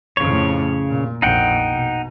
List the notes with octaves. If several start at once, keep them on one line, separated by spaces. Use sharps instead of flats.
F2 A2 C#3 C#5
A#2
A#1 F2 D#4 F#5 G5
B2